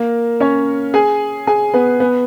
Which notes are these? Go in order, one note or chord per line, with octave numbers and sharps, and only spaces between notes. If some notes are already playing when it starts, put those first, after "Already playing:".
Already playing: A#3 A#4
C#4 C#5
G#4 G#5
G#4 G#5
B3 B4
B3 B4